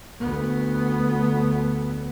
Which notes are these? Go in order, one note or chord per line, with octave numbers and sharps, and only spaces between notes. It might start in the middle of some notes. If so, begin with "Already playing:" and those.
D2 B3